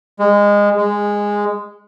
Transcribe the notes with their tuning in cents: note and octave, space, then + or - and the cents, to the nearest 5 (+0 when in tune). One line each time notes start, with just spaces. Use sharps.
G#3 -20
G#3 -10